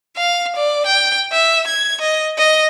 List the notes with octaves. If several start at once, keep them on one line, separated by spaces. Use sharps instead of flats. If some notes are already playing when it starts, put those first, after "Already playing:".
F5
D5
G5
E5
G#6
D#5
D#5